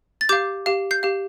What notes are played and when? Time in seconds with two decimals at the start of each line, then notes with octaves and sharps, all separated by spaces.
0.21 A6
0.29 G4 F5 D6 G6
0.66 G4 F5
0.91 G6 C7
1.03 G4 F5